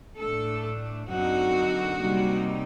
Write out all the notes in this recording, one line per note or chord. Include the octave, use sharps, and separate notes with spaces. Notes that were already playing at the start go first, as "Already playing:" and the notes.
A2 A3 D4 A4
F#2 D3 F#3 C4 D#4 F#4
C3 G3 A#3 D#4